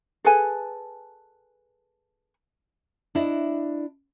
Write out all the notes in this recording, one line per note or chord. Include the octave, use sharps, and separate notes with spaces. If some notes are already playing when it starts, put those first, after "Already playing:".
G#4 A4 B4 G#5
D4 E4 D5 D#5